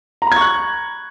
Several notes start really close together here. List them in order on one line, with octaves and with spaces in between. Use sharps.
A#5 B5 G#6 C#6 F#6